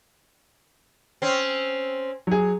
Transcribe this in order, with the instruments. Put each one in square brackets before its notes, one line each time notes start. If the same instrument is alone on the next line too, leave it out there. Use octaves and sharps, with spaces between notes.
[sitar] C4 C#4
[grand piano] F#3 G#4